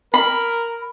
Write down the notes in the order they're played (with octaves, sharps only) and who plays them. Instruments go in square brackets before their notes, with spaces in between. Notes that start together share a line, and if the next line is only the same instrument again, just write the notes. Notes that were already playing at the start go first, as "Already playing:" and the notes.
[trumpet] A#4 [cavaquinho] B5